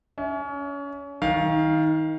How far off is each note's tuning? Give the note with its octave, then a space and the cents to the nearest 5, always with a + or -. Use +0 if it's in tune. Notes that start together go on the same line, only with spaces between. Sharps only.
C#4 +30 E5 -10
D#3 +25 F5 +0